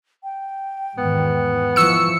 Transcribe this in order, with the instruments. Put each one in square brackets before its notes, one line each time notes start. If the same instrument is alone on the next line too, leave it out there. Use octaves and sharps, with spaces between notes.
[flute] G5
[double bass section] E2 G#2 D#3 [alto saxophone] B3
[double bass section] E3 F3 [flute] C#6 [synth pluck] E6 C#7